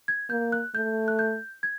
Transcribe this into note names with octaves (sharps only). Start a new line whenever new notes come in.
G#6
A#3 G6
F#6
A3 G6
F#6
G6
G#6